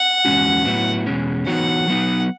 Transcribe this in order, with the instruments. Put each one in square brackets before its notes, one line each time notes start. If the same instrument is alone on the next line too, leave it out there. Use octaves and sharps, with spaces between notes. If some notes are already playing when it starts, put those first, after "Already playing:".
Already playing: [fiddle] F#5
[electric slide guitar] E2 B2 G#3 C#4 F#4
A2 F#3 B3 E4
E2 B2 G#3 C#4
[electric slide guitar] E3 B3 D#4 F#4 C#5 [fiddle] F#5
[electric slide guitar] F#3 B3 D#4